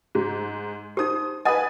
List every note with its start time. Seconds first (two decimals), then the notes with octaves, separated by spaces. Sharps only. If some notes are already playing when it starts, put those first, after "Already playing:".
0.15 G#2
0.97 D#4 G4 C5 D#6
1.45 B4 D#5 F#5 G#5 D#6